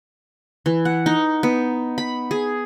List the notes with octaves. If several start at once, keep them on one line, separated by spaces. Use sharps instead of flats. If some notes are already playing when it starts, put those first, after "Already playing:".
E3
F#5
D#4
B3
B5
G#4